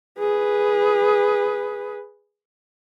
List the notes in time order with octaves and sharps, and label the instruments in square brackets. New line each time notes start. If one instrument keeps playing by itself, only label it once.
[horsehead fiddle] G#4 B4